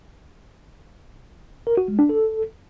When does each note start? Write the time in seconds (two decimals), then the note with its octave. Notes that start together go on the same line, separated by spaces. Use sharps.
1.67 A#4
1.77 F#4
1.88 G#3
1.99 D4
2.09 A4